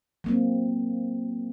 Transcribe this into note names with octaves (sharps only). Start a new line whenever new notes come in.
F#3 A#3 C4